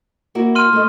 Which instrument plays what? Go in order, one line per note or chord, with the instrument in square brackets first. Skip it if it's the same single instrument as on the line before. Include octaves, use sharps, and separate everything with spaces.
[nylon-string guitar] A#3 E4 F#4
[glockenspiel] C6 F6 D#7
[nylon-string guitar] A3 D#5